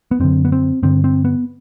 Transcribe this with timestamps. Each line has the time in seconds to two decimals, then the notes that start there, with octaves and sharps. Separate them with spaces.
0.11 B3
0.20 F#2 D3 C4
0.45 B3
0.52 C4
0.83 G2 D3 C4
1.04 C4
1.25 B3